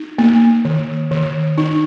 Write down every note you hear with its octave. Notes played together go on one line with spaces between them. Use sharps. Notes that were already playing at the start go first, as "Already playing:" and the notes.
Already playing: D#4
A#3
D#3
D#3
D#4